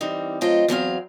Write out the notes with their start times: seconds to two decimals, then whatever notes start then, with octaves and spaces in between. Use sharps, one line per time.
0.01 E3 G3 C4 D#4
0.41 F#3 A3 C4 F4 D#5 G5
0.68 E2 F#3 C4 F5